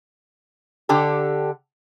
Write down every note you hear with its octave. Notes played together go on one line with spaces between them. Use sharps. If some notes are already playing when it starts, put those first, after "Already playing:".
D3 G4 A4